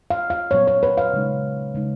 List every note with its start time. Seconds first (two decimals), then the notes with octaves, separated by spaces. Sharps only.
0.10 F5
0.30 F5
0.51 A#2 F#3 B3 C#5
0.67 C#5
0.83 B4
0.98 F5
1.13 C#3 G#3 D#4
1.75 C#3 G#3 D#4